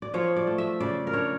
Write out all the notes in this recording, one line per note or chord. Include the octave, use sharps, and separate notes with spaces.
D5
F3 C#5
D5
A3
E5
C#3 D5
A#4
D4 C#5